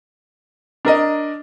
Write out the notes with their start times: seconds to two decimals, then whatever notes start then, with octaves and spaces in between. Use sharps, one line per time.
0.85 D4 A#4 D#5